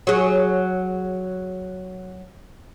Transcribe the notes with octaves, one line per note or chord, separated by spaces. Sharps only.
F#3 G#4